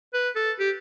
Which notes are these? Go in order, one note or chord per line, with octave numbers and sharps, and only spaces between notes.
B4
A4
G4